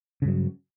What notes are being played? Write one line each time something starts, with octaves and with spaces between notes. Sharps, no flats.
G2 C#3 F#3